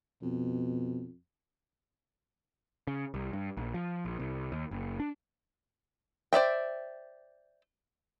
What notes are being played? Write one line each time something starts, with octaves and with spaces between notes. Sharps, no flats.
F2 B2
C#3
C2
G2
A#1
F3
A#1
C2
D#2
F#1
D4
C5 D5 E5 G5